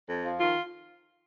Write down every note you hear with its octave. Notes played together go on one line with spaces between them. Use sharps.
F2
F3
D#3 F4